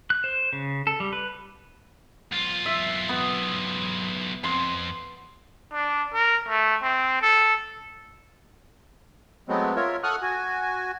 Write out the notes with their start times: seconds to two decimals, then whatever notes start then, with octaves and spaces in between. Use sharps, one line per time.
0.10 F#6
0.24 C5
0.53 C#3
0.87 A4
1.00 G3
1.13 B4
2.32 B1 F4
2.66 E5
3.09 B3
4.44 F2 C6
5.73 D4
6.14 A#4
6.49 A3
6.83 C4
7.22 A4
9.49 F#3 G#3 A3 B3 C4
9.76 F4 A#4 C#5 E5
10.03 A4 F#5 C#6 D#6 F6 F#6
10.22 F#4 G#5